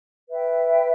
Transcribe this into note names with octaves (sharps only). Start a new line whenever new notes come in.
B4 E5 G5